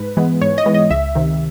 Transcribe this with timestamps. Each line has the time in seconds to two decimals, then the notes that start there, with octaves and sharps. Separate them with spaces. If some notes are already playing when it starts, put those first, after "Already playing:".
Already playing: G#2 B4
0.17 E3 G#3 B3
0.41 G#2 C#5
0.58 D#5
0.66 E3 G#3 B3
0.74 D#5
0.90 C#2 E5
1.15 C3 D#3